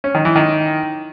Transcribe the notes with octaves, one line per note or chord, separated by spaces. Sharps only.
C#4
D#3
E3
D#3